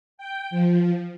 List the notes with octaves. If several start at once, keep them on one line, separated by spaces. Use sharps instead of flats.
G5
F3